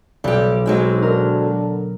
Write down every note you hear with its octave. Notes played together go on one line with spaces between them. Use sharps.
B1 G3 G4
F#3 G#3 C4 D#4
D3 A#4